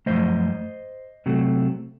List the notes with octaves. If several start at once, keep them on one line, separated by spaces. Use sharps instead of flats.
F#2 F3 A3 C5 D#5
C3 F#3 A3